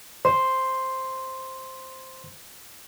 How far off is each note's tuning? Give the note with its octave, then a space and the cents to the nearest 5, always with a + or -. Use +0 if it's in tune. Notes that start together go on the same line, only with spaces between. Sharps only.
C5 +0 C6 +0